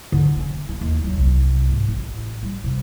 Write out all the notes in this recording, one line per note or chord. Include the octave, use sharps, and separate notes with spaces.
D3
C#4
A#3
D#2
F#3
C2
G#2
A1
G3
C3